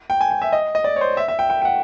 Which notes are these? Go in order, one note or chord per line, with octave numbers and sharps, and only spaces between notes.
G5
G#5
G5
E5
D#5
D#5
D5
C#5
C5
E5
E5
G5
G5
G5
F#5